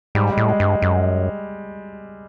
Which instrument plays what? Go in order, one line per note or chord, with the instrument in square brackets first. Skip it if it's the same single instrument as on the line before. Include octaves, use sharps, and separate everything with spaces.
[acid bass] G#2 [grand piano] G3
[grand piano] G#3
[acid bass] A2
[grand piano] G#3
[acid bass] G2
F#2